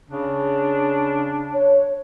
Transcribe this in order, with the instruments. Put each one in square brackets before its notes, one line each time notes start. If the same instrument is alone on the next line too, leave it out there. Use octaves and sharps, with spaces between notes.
[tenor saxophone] C#3 [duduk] D4
[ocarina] C#5